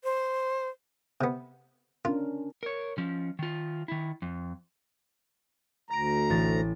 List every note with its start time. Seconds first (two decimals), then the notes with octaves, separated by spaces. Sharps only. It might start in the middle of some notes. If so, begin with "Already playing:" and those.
0.04 C5
1.21 C3 B3
2.05 C#4 D4 F4 A#4
2.63 A#4 C#5
2.98 F3 C#4
3.39 D#3 F4
3.88 D#3 E4
4.22 F2
5.90 D2 A#5 A#6 D7
6.30 A1 A2 A6